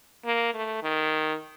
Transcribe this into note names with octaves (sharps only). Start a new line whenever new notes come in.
A#3
A3
D#3